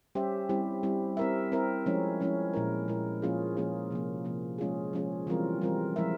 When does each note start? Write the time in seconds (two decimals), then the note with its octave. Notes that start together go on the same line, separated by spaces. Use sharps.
0.15 G3 C#4 G4 C5 E5
0.49 G3 C4 E4 G4
0.83 G3 C4 E4 G4
1.17 C4 E4 A#4 E5
1.52 C4 E4 A#4 E5
1.86 F3 G#3 C#4 E4
2.20 F3 G#3 C#4 E4
2.54 A#2 G#3 E4 A#4
2.88 A#2 G#3 E4 A#4
3.22 F3 A#3 C#4 F4 G#4
3.57 F3 A#3 C#4 F4 G#4
3.91 C3 F3 A#3
4.25 C3 F3 A#3
4.58 F3 G#3 C#4 F4 G#4
4.93 F3 G#3 C#4 F4 G#4
5.27 E3 G3 C4 F4 A#4
5.61 E3 G3 C4 F4 A#4
5.96 F3 G#3 E4 A#4 E5